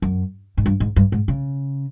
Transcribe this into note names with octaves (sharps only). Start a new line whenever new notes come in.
F#2
G#2
G2
G#2
G2
G#2
C#3